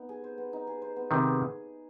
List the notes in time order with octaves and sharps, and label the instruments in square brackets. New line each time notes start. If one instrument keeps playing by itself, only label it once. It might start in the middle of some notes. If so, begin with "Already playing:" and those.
Already playing: [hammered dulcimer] B3 D#4
G#4
C5
B3
D#4
G#4
C5
B3
[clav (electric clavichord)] C3 D#3 [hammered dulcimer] B3
[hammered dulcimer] G#4